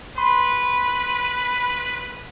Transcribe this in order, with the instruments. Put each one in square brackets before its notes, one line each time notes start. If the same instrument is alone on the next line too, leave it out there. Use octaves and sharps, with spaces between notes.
[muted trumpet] B4 [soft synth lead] B5 [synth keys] C6